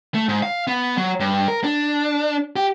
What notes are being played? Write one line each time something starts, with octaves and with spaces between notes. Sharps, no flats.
A3
G#2
F5
B3
F#3
G2
A#4
D4
G4